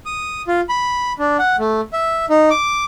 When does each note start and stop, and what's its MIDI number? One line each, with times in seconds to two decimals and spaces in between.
0.06 0.42 87
0.48 0.61 65
0.69 1.13 83
1.19 1.37 62
1.39 1.56 78
1.59 1.81 57
1.93 2.25 76
2.30 2.49 63
2.50 2.84 86